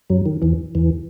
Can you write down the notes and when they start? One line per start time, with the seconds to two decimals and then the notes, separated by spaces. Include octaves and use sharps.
0.10 F#2 F#3
0.26 D#3
0.42 E2 E3
0.75 E2 E3